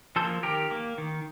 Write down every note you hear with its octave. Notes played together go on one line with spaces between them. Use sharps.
F3 A#3 A4 C5
D#3 G4 A#4
A#3
D#3